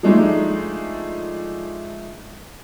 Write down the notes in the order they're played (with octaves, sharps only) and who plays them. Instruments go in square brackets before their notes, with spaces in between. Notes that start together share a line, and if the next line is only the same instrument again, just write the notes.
[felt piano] F3 G#3 A3 D4 D#4